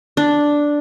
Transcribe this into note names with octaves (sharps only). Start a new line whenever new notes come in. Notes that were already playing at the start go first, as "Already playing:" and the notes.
D4